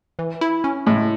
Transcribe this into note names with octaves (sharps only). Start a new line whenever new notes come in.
E3
E4
C#4
A2 G#3